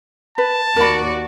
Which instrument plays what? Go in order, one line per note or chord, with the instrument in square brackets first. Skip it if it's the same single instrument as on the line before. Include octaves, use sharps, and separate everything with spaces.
[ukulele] B4 [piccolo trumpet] A5
[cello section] D#2 F#4 D5 [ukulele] A#4 B5